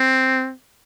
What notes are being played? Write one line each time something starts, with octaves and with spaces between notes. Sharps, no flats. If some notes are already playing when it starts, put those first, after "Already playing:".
Already playing: C4